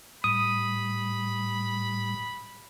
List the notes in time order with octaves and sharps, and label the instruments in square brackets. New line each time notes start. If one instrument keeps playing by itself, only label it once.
[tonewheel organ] A2 G3 [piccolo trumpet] B5 [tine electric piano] D#6